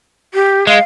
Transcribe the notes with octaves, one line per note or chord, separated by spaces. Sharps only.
G4
G#3 F5